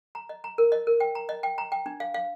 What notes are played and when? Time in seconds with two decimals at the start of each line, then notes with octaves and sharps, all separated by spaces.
0.15 A#5
0.29 D#5
0.44 A#5
0.58 A#4
0.72 D#5
0.87 A#4
1.00 G5
1.15 A#5
1.29 D#5
1.43 G5
1.58 A#5
1.72 G5
1.86 D4
2.00 F5
2.14 F5